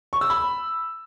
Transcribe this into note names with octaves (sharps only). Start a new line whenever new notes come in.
C#6
E6
B5